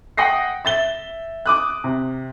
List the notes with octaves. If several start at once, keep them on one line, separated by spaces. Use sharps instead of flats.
F#5 G5 D#6 A#6 C7
E5 A6 G7
D6 D#6 F#6
C3